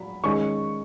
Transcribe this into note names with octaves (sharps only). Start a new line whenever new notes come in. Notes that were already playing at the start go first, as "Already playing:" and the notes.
Already playing: F#3 B5
D#3 G#3 C#4 C#6